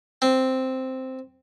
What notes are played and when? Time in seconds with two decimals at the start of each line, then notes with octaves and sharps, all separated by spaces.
0.22 C4